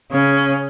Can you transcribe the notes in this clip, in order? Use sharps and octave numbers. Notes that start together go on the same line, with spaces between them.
C#3 C#4